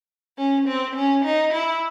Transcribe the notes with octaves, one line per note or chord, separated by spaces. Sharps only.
C#4
C4
C#4
D#4
E4